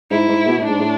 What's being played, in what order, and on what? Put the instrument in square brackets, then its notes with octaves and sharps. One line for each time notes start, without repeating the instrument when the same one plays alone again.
[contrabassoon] G#2 [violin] E4
[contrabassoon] G#2
B2
A2
[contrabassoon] G#2 [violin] D4
[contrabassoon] A2